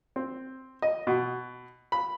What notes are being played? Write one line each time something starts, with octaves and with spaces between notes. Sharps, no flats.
C4
D#5
B2
B5